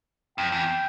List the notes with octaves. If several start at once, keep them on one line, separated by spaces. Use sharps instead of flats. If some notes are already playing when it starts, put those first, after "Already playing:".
F2 G5
E2